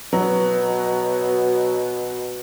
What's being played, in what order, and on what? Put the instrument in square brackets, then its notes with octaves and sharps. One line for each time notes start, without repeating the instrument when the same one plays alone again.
[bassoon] B2 [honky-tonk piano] F#3